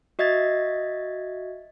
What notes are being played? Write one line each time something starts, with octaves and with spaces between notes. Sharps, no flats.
F#4 D#5 E5 G#6 A6